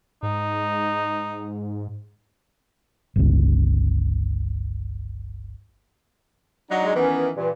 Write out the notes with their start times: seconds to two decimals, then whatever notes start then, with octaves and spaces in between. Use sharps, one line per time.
0.23 G#2 D#4
3.16 G1 C#2
6.70 F#3 D4 D#4 F#5 A#5
6.83 G#3
6.95 D#3 E3 B3 C#4
7.34 G2 A#2 E3